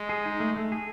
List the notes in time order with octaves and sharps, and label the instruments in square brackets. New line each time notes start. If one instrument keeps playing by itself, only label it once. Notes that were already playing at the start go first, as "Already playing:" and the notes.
Already playing: [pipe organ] G#3
[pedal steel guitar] G#4
D#4
A3
A3
G#4